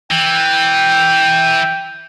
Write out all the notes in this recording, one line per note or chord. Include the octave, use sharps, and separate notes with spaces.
E3 G5